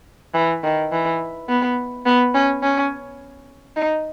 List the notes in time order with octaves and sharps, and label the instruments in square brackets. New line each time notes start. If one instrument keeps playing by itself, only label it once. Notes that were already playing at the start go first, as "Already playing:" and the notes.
[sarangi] E3
D#3
E3
B3
B3
C#4
C#4
D#4